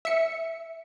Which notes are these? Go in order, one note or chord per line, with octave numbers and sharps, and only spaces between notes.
E5 C#7